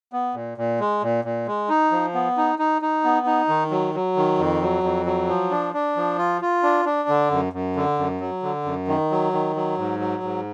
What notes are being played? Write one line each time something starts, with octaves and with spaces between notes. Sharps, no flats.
B3
A#2
A#2
G#3
A#2
A#2
G#3
D#4
F3
B3
D#4
D#4
D#4
B3
D#4
D#3
F#3
F#3
D#3
F2
F#3
F2
F#3
F3
D4
D4
F3
F4
F4
D4
D4
D3
F#2
F#2
D3
F#2
F#3
D3
F#2
D#3
F#3
D#3
F#3
G#2
F#3
G#2